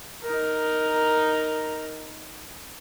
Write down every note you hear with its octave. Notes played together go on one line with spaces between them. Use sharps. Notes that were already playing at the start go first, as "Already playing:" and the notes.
D#4 A#4